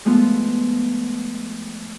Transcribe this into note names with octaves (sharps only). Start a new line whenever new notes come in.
F3 G#3 A3 B3 F4